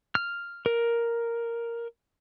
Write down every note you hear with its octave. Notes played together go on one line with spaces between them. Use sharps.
F6
A#4